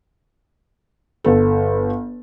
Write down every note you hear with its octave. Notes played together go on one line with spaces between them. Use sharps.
G1 A4